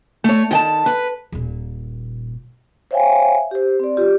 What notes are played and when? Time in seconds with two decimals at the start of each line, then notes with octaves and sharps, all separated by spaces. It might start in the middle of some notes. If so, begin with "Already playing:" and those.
0.24 A3 C#5
0.51 D#3 G5 A5
0.86 B4
1.32 D#1 A#2
2.91 C5 C#5 E5 F5 G5 G#5
3.51 G4 C5
3.80 C4 D5
3.97 F4 G4